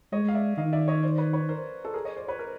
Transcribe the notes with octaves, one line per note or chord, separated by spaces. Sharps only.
G#3 C#5 D#5
F5
D5 E5
D#3 D#5 F5
D5 E5
C#5 D#5
C5 D5
B4 C#5
B4 C#5
A#4 C5
A4
G#4 A#4
C#5 D#5
C5 D5
B4 C#5
A#4 C5